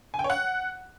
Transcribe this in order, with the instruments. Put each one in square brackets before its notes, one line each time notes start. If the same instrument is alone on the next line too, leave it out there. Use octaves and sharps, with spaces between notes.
[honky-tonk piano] G#5
G5
C#5
F#5